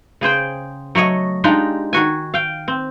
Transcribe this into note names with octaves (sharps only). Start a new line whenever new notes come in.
C#3 G#4 C5 G5
F#3 A3 C#5 D#5
G#3 D4 D#4 F4 G4
D#3 F#4 G#5
F5 G5
C4